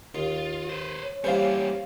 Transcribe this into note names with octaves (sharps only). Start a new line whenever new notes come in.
D#2 F4
B4 C5
C#5
E3 G3 A#3 C#4 C5 F5